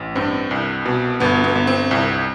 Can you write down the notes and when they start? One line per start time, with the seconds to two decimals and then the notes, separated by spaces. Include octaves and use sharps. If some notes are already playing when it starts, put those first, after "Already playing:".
Already playing: A1
0.15 G2 C4
0.51 C2
0.85 B2
1.20 G1 B3
1.44 B3
1.55 G1
1.67 C4
1.91 C2